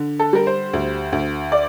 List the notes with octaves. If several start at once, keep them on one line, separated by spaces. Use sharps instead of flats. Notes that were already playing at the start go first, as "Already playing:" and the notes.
Already playing: D3
A4
G3 A#4
C5
D2
D2
D5